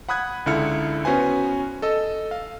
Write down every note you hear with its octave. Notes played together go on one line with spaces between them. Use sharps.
F#5 B5 D#6 F#6 G#6
C#2 D3 E4 F6 C#7
B3 C#4 F#4 B4 C5 G#5
A4 D#5 E6
F5